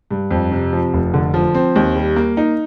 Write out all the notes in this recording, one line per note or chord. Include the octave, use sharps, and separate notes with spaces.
G2
F2
C3
F3
F1
D3
F3
C4
D#2
G3
A#3
D#4